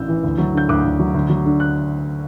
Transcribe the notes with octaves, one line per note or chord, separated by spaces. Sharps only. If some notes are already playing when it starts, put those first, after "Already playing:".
Already playing: A1 E6 G6
E3
D2
F#3
D3 G6
D2 D6 F#6
D2
F#3
D2
F#3
D3
F#6